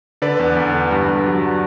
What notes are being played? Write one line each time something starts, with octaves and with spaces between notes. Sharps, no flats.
D3 B4 D5
E2
E2
D3
G2
G2
F#3